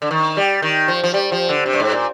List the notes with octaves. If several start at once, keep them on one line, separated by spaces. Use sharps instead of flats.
D3
D#3
G3
D#3
F3
F3
G3
F3
D3
C3
G2
G#2
A#2